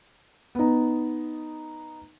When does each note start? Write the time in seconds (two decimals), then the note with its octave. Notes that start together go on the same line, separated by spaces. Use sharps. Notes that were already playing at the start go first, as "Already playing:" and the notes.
0.55 B3 D#4